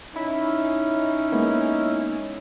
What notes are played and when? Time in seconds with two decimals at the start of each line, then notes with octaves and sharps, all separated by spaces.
0.16 C#4 D#4 E4
1.32 G#3 A#3 B3